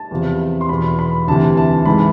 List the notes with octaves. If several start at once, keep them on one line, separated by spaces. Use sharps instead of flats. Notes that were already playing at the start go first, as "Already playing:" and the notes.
Already playing: A5
E2 C3 F3
C6
E2 B2 B5
B5
D2 C3 E3 A5
A5
G#2 E3 B5